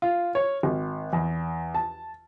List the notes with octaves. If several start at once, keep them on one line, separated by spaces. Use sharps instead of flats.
F4
C#5
G#1
E2
A5